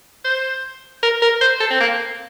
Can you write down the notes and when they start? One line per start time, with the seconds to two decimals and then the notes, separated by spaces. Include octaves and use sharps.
0.25 C5
1.03 A#4
1.22 A#4
1.41 C5
1.60 A4
1.70 C4
1.80 A#3